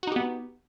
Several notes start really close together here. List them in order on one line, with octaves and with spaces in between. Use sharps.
F#4 D#4 G4 B3